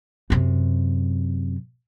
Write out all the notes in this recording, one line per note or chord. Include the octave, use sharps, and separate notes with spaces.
F#2 C3